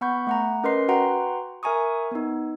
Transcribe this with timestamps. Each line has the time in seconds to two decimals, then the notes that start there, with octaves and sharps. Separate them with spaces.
0.01 B3 F#5 B5 C#6 G6
0.27 A3 F#5 A#5
0.64 C#4 A#4 B4 D#5 C6 C7
0.88 F#4 B4 F#5 G5 A#5 C6
1.63 A#4 E5 G#5 A#5 C#6 D#6
2.11 B3 D#4